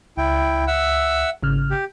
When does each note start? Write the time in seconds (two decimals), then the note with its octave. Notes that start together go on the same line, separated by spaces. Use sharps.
0.17 C#2 E4 G5
0.67 E5 F#5 E6
1.43 G#1 C#3 F6
1.71 G4